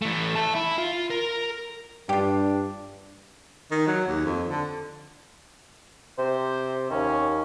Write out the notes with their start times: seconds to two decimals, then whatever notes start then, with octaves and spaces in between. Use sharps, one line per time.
0.02 E3 A3
0.35 E5 A5
0.55 E4
0.78 F4
1.10 A#4
2.09 G2 D4 F4 G4
3.71 D#3
3.87 F#3
4.07 D#2
4.25 F2
4.50 D3
6.18 C3 C5
6.90 D#2 C#4